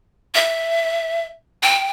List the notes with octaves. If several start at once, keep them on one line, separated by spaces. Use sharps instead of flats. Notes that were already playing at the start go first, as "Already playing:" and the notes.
E5
G5